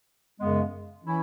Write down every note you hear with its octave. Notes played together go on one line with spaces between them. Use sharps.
F#2 C#3 G#3 B3
E3 C#4 E4